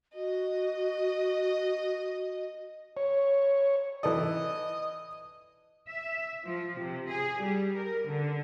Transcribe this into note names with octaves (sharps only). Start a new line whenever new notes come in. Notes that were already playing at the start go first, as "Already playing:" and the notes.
F#4 D#5
C#5
E3 A4 D5 D#5
E5
F3
C3
G#4
G3
A#4
D3